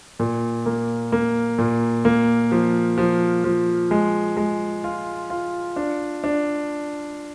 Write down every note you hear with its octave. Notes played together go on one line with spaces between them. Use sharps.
A#2
A#3
A#3
A#2
A#3
F3
F3
F3
G#3
G#3
F4
F4
D4
D4